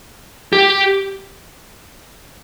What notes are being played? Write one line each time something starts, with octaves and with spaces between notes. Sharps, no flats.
G4